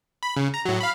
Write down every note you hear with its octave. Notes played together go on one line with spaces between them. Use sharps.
B5
C#3
A#5
A2 F#3
F5 B5